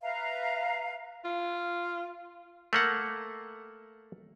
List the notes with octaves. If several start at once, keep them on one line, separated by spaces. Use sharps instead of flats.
B4 E5 F5 A#5
F4
A3 A#3 F#5